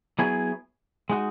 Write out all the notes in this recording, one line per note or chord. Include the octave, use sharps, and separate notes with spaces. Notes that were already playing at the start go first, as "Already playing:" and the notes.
F#3 B3 E4 G#4
G#3 D#4 F#4